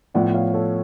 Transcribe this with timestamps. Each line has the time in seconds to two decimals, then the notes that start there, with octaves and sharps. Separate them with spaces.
0.14 A2 F3 B3 D5 F#5
0.34 C#5 F5
0.54 A4 C#5